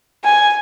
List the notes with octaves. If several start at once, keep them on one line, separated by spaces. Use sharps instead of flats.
G#5